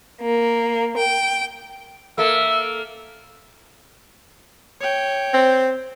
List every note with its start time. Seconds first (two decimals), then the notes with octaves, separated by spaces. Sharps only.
0.21 A#3
0.97 G5
2.18 A#3 A4 E5
4.80 C#5 G5
5.33 C4